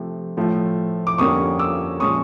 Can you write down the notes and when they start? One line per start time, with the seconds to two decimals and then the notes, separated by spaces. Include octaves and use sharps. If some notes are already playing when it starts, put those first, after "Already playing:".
Already playing: C3 F3 A3
0.37 A2 F3 A3
1.07 D6
1.18 F2 D3 G3 A#3 C#4 C#6 D#6
1.59 D6 E6
2.00 A#2 F3 G#3 C#4 C#6 D#6